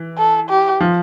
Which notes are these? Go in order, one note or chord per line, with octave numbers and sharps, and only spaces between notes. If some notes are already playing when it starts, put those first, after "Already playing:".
Already playing: E3
A4
G4
F3